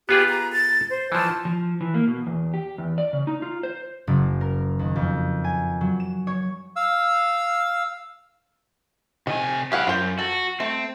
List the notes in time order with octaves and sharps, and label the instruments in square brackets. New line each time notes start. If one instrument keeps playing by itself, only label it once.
[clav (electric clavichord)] B3 F4 G#4 [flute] G4
[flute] A#5
A6
C5
[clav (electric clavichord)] E3 F3 [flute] A5
[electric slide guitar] F3
E3
A#3
B2
E2
G4
E2
D5
C#3
D#4
F4
C5
[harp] F#1
A#4
D#2
F2
G#5
F#3
E7
C#5
[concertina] F5 E6
[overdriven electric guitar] C3 G#5 [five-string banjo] D#3
[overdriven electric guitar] E4 G4 [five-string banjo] G#4 F5 F#5
[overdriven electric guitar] F#2 [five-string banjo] F4 C5
[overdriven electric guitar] F#4 [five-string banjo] A4
[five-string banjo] A3 [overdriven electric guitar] C4